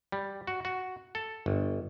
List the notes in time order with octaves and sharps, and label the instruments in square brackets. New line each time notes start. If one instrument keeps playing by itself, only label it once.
[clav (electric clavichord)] G3
F#4
F#4
A4
G1